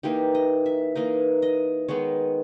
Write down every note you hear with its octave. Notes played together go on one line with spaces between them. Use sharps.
E3 A#3 D#4 G4
D#5
E5
E3 A#3 D#4 D#5
D#5
D#3 G#3 B3 D#4 C#5